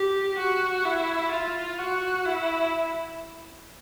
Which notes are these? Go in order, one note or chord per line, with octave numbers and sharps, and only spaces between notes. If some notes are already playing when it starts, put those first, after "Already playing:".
Already playing: G4
F#4
E4
F4
F#4
E4